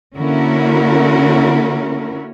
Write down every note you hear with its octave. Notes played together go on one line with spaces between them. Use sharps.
D3 A#3 C#4 E4 F#4 A#4